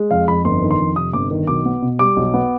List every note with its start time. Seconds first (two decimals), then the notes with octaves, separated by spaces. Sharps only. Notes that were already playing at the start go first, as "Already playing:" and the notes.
Already playing: G#3
0.11 F2 F5
0.28 F2 B5
0.45 G1 C6
0.62 D#3
0.71 C6
0.80 F2
0.96 C3 D#6
1.13 G1 D6
1.31 D#3
1.47 B1 D6
1.65 B3
1.82 B2
1.99 G3 D6
2.16 B1
2.34 B3